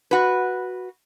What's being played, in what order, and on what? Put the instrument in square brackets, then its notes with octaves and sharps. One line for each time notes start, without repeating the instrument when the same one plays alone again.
[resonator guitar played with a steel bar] F#4 B4